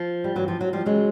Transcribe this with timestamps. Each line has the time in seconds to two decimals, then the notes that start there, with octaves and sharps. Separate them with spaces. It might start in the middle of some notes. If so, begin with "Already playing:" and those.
Already playing: F3
0.24 G3
0.35 G2 E3 F#3
0.48 F3
0.61 F#3
0.73 F3 G3
0.86 C#3 E3 F#3 G#3